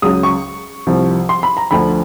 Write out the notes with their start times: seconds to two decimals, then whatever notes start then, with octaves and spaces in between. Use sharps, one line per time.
0.02 C#2 C#3 F#3 D#6
0.23 C#6
0.87 C2 C3 F3
1.29 C6
1.43 B5
1.57 A#5
1.71 D2 D3 F3 B5